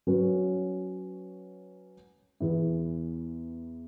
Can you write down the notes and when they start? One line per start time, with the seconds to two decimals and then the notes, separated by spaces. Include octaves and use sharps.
0.07 F#3 C#4 F#4 B4
2.40 E2 E3 B3 E4